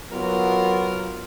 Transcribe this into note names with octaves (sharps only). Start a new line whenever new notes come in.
F#3 B3 F4 A#4